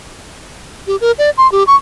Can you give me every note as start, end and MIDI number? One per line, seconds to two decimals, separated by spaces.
0.87 0.96 67
1.01 1.12 70
1.19 1.30 74
1.38 1.50 84
1.52 1.64 67
1.67 1.76 85